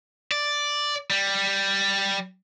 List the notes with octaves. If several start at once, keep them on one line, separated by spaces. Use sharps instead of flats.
D5
G3